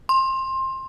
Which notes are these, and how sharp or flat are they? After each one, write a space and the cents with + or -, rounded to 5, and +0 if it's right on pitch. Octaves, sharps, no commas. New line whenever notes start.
C6 +20